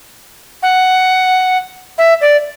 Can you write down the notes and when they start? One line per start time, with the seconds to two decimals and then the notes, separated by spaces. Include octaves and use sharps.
0.63 F#5
1.98 E5
2.21 D5